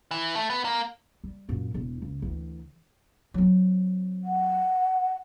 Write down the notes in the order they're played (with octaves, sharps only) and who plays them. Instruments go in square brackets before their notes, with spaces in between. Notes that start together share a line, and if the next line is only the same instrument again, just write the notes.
[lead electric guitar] E3
A3
B3
A#3
[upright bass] G3
F#2 A#2
E1 E2
C#2
D2 E3
F#3 C4
[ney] F#5